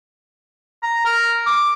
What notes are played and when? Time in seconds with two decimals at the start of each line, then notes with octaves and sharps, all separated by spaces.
0.83 A#5
1.05 A#4
1.46 D6